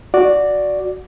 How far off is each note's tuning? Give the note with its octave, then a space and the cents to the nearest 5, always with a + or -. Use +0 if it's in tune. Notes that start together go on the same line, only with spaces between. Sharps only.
F#4 -10 D5 +0